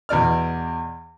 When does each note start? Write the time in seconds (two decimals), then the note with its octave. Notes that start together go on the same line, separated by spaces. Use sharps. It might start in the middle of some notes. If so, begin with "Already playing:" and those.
0.09 E2 B2 D5 F6